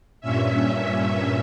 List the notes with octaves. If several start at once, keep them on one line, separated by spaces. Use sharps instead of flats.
G2 A#2 C#4 E5